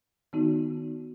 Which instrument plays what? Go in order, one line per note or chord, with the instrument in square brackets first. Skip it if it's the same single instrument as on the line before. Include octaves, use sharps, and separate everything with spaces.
[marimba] D#3 B3 D#4 F#4